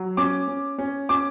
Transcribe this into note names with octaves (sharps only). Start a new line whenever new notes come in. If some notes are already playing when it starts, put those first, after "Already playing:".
Already playing: F#3
C#4 D6
C#4
C#4
C#4 D6